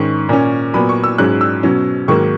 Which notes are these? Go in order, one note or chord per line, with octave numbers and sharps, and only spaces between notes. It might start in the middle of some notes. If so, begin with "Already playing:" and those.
Already playing: G#2 D#3 G#3 C#4 C#6
A#2 A#3 C#4
A#2 F#3 B3 B5
C#6
E6
G#2 F#3 C#4 F#6
E6
B2 F#3 C#4
G#2 D#3 F#3 A#3 C#6